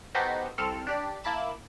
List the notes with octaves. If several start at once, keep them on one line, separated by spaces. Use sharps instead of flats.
B3 D#4 F#4 G4 A4 C5
C2 C4 A4 F6
D4 G4 D5
A#3 E4 A5 B5 D6 E7